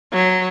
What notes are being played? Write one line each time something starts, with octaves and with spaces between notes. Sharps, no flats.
F#3